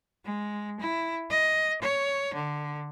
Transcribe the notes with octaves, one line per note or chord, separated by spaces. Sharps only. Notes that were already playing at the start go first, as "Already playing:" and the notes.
G#3
E4
D#5
C#5
D3